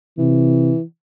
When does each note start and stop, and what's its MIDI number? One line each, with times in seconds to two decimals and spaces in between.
0.18 0.72 48
0.18 0.82 52